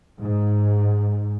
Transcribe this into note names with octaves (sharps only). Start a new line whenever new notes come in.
G#2